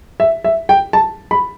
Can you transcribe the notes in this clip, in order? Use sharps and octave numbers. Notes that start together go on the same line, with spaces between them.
E5
E5
G5
A5
B5